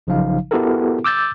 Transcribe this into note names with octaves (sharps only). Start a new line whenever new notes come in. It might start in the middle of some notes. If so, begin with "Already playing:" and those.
A#1 C#3 F3 F#3 D#4 F5
B3 E4 F#4 G4 A4 A#4
D6 E6 G6 A6